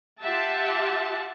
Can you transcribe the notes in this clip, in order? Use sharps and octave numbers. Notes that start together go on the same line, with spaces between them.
F4 G4 E5 F#5 A5